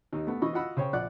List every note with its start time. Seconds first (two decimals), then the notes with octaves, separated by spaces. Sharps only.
0.12 D#2 D#4
0.27 A3 B3
0.42 E3 D#5 B5 C#6
0.53 F4 F#4 D#5 F#5 B5 E6
0.77 C#3 C5 C#5 G5
0.93 A#1 F4 D5 F#5 F#6